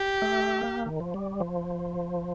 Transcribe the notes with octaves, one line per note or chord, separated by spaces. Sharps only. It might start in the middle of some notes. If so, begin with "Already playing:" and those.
Already playing: G4
A3
A#3
D#3
F3
G3
F3